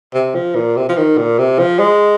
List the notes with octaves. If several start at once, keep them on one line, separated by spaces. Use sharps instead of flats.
C3
F3
A#2
C3
F3
D#3
A#2
C3
F3
G#3